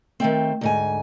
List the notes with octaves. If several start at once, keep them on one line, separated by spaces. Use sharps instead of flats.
D#3 A3 C4
D2 G#2 G#5